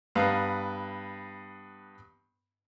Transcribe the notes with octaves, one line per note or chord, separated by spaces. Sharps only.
G2 B3 F5 A#5